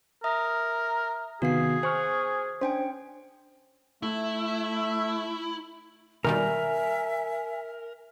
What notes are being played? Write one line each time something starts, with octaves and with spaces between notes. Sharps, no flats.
A#4 E5 D#6
C3 D#3 B3 F#4 G#4 F5 C7
C5 G#5 C#6 F6
C#4 D4 C5 G5 G#5
A3 E4
B2 D#3 G3 A#4 E5 G#5